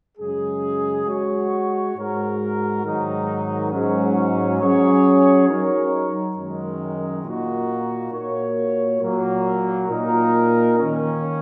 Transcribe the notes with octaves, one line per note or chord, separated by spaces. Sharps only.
F#2 C#3 G#3 C#4 G#4
G#3 F#4 C#5
G#2 G#3 F#4 A#4
G#2 D#3 F#3 D#4
G#2 F#3 C#4
F#3 C#4 G#4 C#5
F#3 D#4 A#4 C#5
F#2 D#3 G#3
A#2 A#3 D#4 F#4
A#2 A#3 F#4 A#4 C#5
A#2 F#3 A#3
A#2 A#3 D#4 A#4
D#3 A#3 C#4